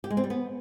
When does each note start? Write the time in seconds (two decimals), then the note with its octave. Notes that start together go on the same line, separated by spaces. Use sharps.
0.04 G4
0.10 G#3
0.17 C4
0.24 G3
0.30 B3